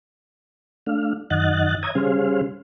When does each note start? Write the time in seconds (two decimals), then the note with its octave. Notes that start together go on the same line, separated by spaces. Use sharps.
0.87 A3 D4 F5
1.30 F#2 D#3 D#5 F#5 F#6 A6
1.83 C#5 E5 A#5 D#6 G#6
1.95 C#3 G3 C#4 G#4 C5 F5